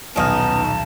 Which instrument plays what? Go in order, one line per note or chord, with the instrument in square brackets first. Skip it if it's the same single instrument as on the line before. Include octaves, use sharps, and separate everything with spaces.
[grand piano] D#1 B1 F6 [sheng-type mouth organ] B3 [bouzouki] C#4 D#4 [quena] A5